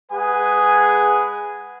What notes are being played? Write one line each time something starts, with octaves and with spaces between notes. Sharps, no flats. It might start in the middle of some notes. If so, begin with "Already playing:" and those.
G#3 G#4 B4 F#5 G#5 D#6